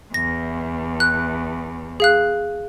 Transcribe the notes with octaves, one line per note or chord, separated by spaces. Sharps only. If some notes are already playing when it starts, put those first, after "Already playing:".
E2 A#6
F#6
G#4 F5 F#6